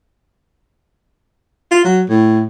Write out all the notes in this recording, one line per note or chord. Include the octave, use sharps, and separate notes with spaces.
F4
F#3
A2